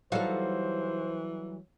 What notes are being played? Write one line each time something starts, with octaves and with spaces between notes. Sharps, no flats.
E3 F#3 G3 D#4 F#4 A4 C5 F5